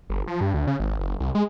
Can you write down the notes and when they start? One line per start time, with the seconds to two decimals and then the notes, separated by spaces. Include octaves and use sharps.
0.10 G1
0.27 F3
0.41 G2
0.54 D2
0.67 C#3
0.80 G#1
1.00 F#1
1.20 C2
1.35 G#3